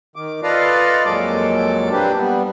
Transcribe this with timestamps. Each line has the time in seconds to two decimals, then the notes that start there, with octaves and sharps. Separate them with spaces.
0.16 D#3 D6
0.43 F4 A4 B4 D5 D#5 F5
1.06 F2 A#2 F#3 G#3 A4 D6
1.92 A#3 C4 D4 G4 B4
2.18 G3 B3